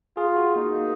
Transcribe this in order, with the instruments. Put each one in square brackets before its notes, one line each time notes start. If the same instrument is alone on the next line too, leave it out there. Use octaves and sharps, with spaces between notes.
[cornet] F4 [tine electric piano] G#4
[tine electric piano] F#4
[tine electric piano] A#3 [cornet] D#4
[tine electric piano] A#3